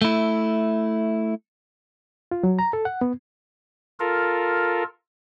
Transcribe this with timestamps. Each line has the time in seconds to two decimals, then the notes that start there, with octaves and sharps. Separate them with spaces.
0.02 A3 E4
2.31 F4
2.43 F#3
2.59 A#5
2.73 A4
2.85 F#5
3.01 B3
4.00 F4 A4 A#4